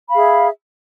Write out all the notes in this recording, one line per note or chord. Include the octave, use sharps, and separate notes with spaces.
G#4 E5 F5 B5